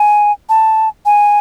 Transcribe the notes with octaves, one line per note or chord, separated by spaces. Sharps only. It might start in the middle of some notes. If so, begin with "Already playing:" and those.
Already playing: G#5
A5
G#5